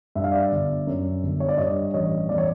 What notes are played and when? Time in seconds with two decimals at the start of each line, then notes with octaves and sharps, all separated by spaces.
0.15 G2 E5
0.24 F5
0.32 D5 E5
0.52 G1
0.87 F#2
1.23 G1
1.40 C#5
1.49 D5
1.58 G2 C#5 D#5
1.94 A1 C#5 D#5
2.29 E2 D5
2.38 C#5